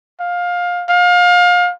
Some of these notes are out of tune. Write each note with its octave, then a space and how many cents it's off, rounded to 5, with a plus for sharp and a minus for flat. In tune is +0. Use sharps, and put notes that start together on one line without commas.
F5 +20
F5 +30